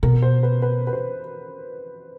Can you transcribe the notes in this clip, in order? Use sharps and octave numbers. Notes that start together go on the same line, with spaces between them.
B2 A#4
C5
B4
B4
B4
C5